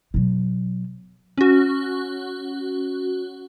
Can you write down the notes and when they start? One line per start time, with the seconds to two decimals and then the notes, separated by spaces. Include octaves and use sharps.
0.14 B2 F#3
1.37 C#4 F#4